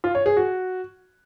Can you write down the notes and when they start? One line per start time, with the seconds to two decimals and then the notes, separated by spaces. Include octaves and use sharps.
0.04 F4
0.15 C#5
0.26 G#4
0.37 F#4